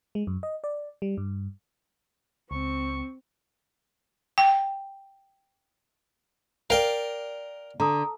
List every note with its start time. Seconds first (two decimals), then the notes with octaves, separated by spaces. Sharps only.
0.15 G#3
0.27 F#2
0.43 D#5
0.64 D5
1.02 G3
1.17 G2
2.51 C#2 C4 C#6
4.38 G5
6.70 A#4 D5 F5 G5
7.80 D3 A#5 D#6